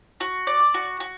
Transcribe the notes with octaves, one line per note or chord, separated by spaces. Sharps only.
F#4
D5
F#4
F#4